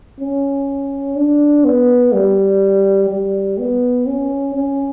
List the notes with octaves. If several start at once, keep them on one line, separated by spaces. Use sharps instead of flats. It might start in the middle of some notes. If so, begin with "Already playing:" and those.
C#4
D4
B3
G3
G3
B3
C#4
C#4